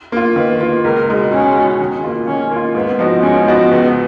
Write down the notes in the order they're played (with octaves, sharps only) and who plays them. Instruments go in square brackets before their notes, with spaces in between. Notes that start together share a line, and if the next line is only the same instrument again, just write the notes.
[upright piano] A#3 F4
[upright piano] D#3 [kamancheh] B4
[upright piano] A#3 F4
[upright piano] C#2 [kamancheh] A#4
[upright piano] B2 G#3 D#4
[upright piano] C#2 [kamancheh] C#4
[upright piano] B2 G#3 D#4
D#3
A#3 F4
[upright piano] D#3 [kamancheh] C#4
[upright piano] A#3 F4
[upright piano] G#2 [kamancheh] B3
[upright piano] F3 B3 D#4 F#4
[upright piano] G#2 [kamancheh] C#4
[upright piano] F3 B3 D#4 F#4
[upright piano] C#2 [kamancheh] B3